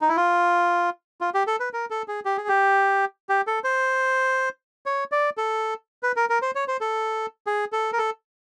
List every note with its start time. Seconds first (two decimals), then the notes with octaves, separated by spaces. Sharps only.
0.01 D#4
0.09 E4
0.17 F4
1.21 F4
1.34 G4
1.47 A4
1.60 B4
1.73 A#4
1.90 A4
2.08 G#4
2.25 G4
2.37 G#4
2.48 G4
3.29 G4
3.47 A4
3.64 C5
4.86 C#5
5.12 D5
5.37 A4
6.03 B4
6.16 A#4
6.29 A#4
6.42 C5
6.55 C#5
6.68 C5
6.81 A4
7.47 G#4
7.72 A4
7.93 A#4
7.98 A4